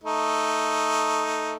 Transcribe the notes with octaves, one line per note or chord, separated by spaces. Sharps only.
A3 D#4